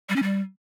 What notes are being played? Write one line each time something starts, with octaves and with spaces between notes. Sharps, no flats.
G3
C#4
G3